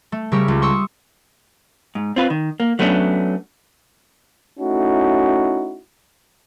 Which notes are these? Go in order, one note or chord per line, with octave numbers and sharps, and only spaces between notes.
A3
C#3 G3 G4 A#4 C#6 E6
C#2
C6 C#6 D#6 E6
G#2
C4 F4 B4
D#3
A#3
F#3 A3 B3 C#4 D4
A3 C#4 D#4 E4 F#4